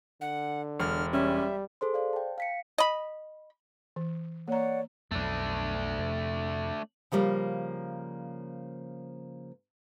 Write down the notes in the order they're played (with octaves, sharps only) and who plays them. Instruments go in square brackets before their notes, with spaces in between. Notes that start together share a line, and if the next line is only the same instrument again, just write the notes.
[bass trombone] D3 [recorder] F#5
[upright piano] E1 [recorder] F6
[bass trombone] G3 [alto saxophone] C#4 [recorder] E5
[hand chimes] G#4 A4 C5 C6
C5 D5 F5
G5 A5
F5 B6 C#7
[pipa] D#5 B5
[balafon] E3
[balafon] A#3 A#5 [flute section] C#5 D5 F#5
[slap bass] B1 F2 [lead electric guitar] A3 D4
[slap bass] F2 C3
[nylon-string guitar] C#3 F3 G3 A#3